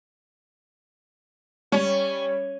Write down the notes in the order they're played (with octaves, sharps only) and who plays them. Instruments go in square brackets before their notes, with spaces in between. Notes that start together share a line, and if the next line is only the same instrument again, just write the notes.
[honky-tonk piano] G3 C#5 [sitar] C#4